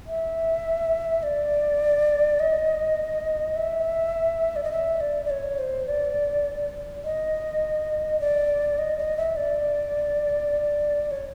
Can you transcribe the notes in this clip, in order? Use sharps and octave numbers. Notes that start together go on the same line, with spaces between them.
E5
D5
D#5
E5
D5
D#5
E5
D5
D5
C#5
C5
D5
D#5
D5
D#5
D#5
E5
D5
C#5